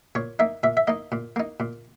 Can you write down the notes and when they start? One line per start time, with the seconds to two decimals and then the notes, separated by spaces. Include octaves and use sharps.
0.15 A#2 C#5
0.39 A#3 D#4 E5
0.63 A#2 E5
0.77 E5
0.87 A#3 D#4 D#5
1.12 A#2
1.36 A#3 D#4
1.60 A#2